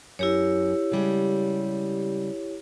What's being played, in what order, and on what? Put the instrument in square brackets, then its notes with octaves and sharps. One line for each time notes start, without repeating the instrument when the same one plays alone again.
[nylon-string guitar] F#2 [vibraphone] E4 G4 C#5
[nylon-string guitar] C#3 G3 G#3